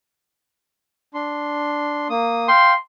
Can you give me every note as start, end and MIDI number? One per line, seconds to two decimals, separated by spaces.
1.14 2.08 62
1.14 2.08 84
2.10 2.48 58
2.10 2.48 87
2.48 2.74 77
2.48 2.74 79
2.48 2.75 84